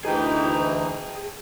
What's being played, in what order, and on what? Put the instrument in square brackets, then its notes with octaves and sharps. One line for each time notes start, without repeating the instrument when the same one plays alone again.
[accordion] D2 E3 D#4 [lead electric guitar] G#4 G5